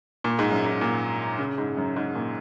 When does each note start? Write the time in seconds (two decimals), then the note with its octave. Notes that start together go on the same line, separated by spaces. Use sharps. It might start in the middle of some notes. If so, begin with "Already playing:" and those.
0.24 A#2
0.39 G#2
0.52 F#2
0.66 G#2
0.81 A#2
1.39 C#3
1.58 G#2
1.77 F#2
1.96 G#2
2.15 A#2